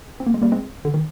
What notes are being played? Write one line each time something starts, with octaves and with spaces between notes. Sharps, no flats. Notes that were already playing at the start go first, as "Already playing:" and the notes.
C4
A#3
G#3
G3 A#3
G#3 C4
D3
D#3